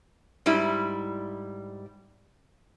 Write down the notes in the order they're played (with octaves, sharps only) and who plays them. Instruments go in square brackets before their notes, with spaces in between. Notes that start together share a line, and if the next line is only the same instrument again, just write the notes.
[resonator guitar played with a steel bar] G#2 G3 E4